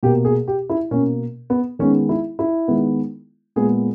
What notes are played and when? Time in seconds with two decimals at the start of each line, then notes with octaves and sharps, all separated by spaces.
0.03 B2 A#3 G4
0.25 G#4
0.48 G4
0.69 E4
0.91 B2 A#3 C#4
1.50 B3
1.79 D#3 G#3 B3 C#4
2.09 E4
2.39 E4
2.68 D#3 G#3 B3
3.56 A#2 G#3 B3 G#4